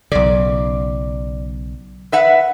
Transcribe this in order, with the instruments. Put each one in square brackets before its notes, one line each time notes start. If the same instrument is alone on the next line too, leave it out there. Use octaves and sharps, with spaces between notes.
[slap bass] B1 C#3 [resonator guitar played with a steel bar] D5
[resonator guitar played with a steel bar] B4 E5 F#5